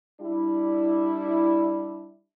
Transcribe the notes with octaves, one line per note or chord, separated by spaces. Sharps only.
G3 D4 E4